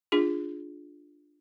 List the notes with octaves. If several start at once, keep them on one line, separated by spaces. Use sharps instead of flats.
D4 F4 G#4